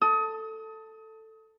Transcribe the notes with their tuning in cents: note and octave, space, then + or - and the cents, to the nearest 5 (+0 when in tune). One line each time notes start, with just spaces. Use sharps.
A4 +10 D#6 +30